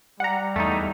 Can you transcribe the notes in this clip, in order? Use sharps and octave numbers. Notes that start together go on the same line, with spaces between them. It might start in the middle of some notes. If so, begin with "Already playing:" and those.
G3 F#5 A#5
E2 A3 D#4